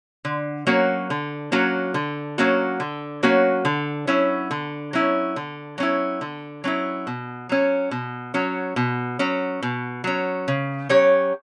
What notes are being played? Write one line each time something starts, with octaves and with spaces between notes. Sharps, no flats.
D3
F#3 A#3 C#4 F#4
D3
F#3 A#3 C#4 F#4
D3
F#3 A#3 C#4 F#4
D3
F#3 A#3 C#4 F#4
D3
F#3 C#4 E4
D3
F#3 C#4 E4
D3
F#3 C#4 E4
D3
F#3 C#4 E4
B2
F#3 C#4
B2
F#3 C#4
B2
F#3 C#4
B2
F#3 C#4
C#3
F#3 C#4 G4 C#5